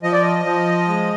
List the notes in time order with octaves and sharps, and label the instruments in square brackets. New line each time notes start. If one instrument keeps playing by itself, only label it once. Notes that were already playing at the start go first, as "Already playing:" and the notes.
[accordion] F3 D#5
D5
D#5
F3
G#3